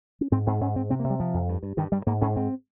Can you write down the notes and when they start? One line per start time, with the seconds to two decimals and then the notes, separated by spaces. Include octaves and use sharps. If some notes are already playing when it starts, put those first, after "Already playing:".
0.21 C#4
0.31 G#2 C4
0.47 G#2 C4
0.61 G#2 C#4
0.76 G#2 C4
0.90 C3 C4
1.00 A#3
1.04 C3
1.10 G3
1.20 C3 F3
1.34 F2
1.49 G2
1.63 G2
1.77 G2 D#3
1.92 G2 G3
2.06 G#2 A#3
2.21 G#2 C#4
2.36 G#2 C4